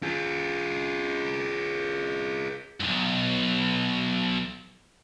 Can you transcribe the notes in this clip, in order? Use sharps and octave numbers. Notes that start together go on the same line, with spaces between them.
F4 G#4
B1 G2